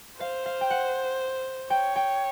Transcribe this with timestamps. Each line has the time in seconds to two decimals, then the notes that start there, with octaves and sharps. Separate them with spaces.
0.20 C5 F5
0.46 F5
0.61 G5
0.70 F#5
1.70 C#5 G5
1.96 G5